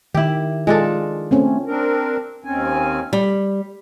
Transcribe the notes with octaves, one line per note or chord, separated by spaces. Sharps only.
D#3 E4 G4
G#3 D4 F4 A4
A3 C4 C#4
C4 D4 A#4
D#2 C4 C#4 G#5
G3